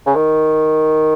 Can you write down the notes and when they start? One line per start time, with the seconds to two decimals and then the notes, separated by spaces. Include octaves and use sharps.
0.06 C#3
0.15 D#3